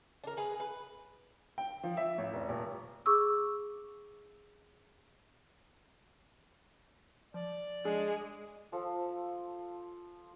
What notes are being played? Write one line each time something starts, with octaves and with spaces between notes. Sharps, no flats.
D4 A#4
G#4 B4
B4
G5
F3
E5
A1
F1
D#1
G#4 C#6 D6 E6
F3 D5
G#3 D4 G#4
F3 A4